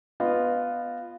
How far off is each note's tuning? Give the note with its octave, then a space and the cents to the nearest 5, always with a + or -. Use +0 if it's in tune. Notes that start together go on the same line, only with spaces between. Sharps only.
B3 +5 F4 +0 D#5 -25